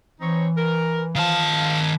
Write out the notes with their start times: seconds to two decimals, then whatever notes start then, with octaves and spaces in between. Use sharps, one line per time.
0.21 E3 C4 D#4 C#5
0.57 A#4
1.16 D#3 F3 F5 A5